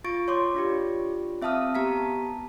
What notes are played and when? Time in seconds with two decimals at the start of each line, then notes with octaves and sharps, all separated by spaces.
0.04 F4 C#6 A6 D7
0.28 C#5 C6 D6
0.55 D4 F4 G4
1.42 C4 E5 F5 A5 D#6 F6
1.75 B3 G4 A5 A#5 B6